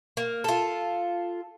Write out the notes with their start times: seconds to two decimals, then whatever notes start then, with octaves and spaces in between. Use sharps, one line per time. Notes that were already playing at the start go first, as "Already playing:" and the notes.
0.17 A#3
0.44 F4 A4